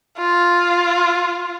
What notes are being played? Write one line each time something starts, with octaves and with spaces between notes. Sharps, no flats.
F4